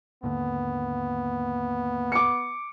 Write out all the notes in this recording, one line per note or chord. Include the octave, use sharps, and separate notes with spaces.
D#2 G#2 D3 A#3 B3
D6 C#7